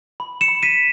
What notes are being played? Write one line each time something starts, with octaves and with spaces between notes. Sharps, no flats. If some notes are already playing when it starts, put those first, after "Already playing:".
B5
C#7 E7
B5
B6 D#7